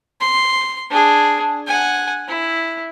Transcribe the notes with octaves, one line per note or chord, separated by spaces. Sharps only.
C6
D4 G#4
F#5 G#5
E4